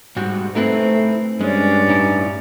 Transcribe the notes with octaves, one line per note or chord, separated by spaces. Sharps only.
G#2 G3 F#4
A3 C4 D#4 E4 B4
G2 G#3 C#4 D5
A2 D#4 E4